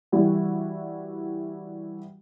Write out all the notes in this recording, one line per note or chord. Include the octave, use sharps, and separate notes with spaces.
E3 G3 E4 F#4